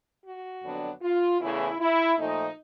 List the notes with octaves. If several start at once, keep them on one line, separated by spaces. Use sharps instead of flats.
F#4
F2 D3 F#3 B3 D4
F4
E2 C#3 E3 A3 E4
E4
A#2 F3 A3 D#4